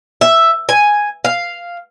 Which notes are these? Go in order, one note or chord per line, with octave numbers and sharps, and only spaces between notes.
E5
G#5
F5